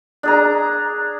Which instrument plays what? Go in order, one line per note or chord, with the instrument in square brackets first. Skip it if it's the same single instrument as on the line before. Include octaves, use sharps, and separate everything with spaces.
[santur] D4 G#4 A#5